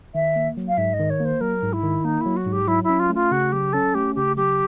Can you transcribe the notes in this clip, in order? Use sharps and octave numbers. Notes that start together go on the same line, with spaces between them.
D#3 E5
A#3
F#3
F5
G#2 E5
D#5
D#3
C#5
A#3
C5
F#3 A#4
G#2
E4
D#3
A#3 D#4
F#3 E4
F#4
G#2
G4
F#3 E4
E4
C#4
F4
A3 F4
C#3 F#4
F#3 G4
C#4 A4
A3 G4
C#3 G4
F#3 G4